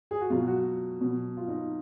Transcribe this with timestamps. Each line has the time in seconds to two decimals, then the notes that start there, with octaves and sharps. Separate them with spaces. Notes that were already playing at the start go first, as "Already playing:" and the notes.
0.11 G#4
0.21 F#4
0.30 B2 F#3 F4
0.47 F#4
1.01 B2 F#3
1.37 F4
1.48 D#4